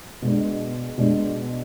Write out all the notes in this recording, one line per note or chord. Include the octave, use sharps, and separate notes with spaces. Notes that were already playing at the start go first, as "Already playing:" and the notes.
B2 G#3 D4
B2 G#3 D4